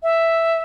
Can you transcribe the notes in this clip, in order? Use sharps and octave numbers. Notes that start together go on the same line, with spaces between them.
E5